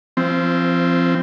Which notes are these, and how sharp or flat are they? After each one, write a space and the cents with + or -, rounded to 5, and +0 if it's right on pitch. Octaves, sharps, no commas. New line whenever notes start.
F3 -25 C4 +0